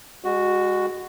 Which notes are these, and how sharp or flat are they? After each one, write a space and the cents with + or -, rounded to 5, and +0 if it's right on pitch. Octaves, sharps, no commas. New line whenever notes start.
G#3 -35 F#4 +0